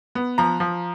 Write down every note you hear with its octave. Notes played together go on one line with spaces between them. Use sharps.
B3
F3 A#5
F3